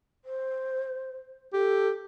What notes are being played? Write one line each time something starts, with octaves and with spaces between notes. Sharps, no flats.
C5
G4 A4